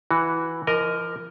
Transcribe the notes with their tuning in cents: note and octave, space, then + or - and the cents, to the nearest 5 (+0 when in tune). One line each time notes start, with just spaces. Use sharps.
E3 +0 F#4 +0
F3 -40 A#4 +0 D#5 +0